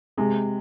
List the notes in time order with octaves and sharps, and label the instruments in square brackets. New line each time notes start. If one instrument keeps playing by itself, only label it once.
[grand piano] C3 [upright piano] G#3